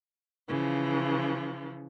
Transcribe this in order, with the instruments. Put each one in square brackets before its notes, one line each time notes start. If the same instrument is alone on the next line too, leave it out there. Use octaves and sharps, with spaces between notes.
[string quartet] C#3 E3 F3